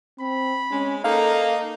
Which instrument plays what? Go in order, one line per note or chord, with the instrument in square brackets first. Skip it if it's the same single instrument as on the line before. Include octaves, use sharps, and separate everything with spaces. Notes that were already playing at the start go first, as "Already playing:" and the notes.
[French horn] C4 [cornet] B5
[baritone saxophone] G#3 [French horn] C#4
[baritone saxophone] A#3 [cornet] D#4 [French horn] A4 [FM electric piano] F5